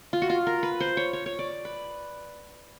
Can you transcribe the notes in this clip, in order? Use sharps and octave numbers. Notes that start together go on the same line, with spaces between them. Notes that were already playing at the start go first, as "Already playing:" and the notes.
F4
F#4
F4
A#4
B4
C5
C#5
C#5
C#5
D5
B4